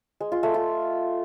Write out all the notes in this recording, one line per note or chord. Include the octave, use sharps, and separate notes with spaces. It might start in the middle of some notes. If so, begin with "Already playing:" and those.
G#3
F4
A3
F4